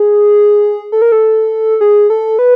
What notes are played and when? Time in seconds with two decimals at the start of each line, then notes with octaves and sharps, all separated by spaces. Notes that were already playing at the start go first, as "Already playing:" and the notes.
Already playing: G#4
0.92 A4
1.02 A#4
1.12 A4
1.81 G#4
2.10 A4
2.39 B4